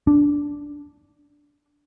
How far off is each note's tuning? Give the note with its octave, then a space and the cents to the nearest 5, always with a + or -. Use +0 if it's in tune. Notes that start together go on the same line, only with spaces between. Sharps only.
D4 -10